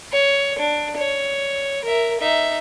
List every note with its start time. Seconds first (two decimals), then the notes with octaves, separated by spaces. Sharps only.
0.12 C#5
0.59 D4
0.97 C#5
1.84 A#4 E5
2.20 D#4 E5